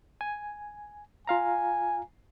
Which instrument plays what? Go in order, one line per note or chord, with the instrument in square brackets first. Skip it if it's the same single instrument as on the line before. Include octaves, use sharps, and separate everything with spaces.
[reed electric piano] G#5
[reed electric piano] F4 F5 A#5 [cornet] G#5